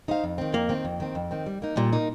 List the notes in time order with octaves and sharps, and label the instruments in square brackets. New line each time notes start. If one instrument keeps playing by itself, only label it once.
[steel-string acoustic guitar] D#4 C5 F5
F2
D#3 C4
[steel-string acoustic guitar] F2 [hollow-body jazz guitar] A#3
[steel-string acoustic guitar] D#3 C4
F2
D#3 C4
F2
D#3 C4
G3
A#3 D#4
[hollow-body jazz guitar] A#2 [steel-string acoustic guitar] G3
[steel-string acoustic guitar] A#3 D#4